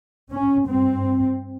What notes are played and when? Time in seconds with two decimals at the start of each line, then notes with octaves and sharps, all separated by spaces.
0.31 C#4
0.69 G2 C4